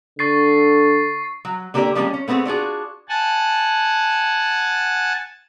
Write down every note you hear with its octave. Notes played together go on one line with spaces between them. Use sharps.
D3 C#6 A6 C7
F#3
D3 A#3 D4 G4 A#4 D5
F3 G3 G#3 A#3 C4 C#4
C#4
A3 B3 C4 F4 G#4
D4 F4 F#4 G#4
F#5 G#5 A5